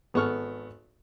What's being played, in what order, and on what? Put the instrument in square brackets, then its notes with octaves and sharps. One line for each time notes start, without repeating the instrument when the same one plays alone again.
[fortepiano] G#1 B3 A4 C#6 F6